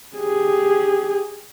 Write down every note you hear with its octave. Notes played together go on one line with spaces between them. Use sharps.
G4 G#4